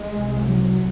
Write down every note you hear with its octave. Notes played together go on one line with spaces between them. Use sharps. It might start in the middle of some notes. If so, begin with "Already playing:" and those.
Already playing: G#3
C2 C3
F#3